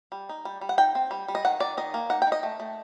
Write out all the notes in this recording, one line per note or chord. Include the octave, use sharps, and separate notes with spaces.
G3
D#4
G3
G3
F#5
D#4 G5
C4
G3
G3
D#5
D#3 F#5
D#3 D5
D#3 D#5
A#3
D#4 F#5
G5
D#4
D#5
A3
A3